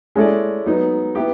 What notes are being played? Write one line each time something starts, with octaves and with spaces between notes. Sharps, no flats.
G#3 C#4 E4 A4 D5
F#3 B3 D#4
B3 E4 G4